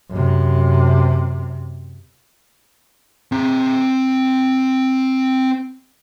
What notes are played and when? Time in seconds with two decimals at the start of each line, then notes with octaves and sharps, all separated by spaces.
0.10 F#2 C3
3.32 C4 A#5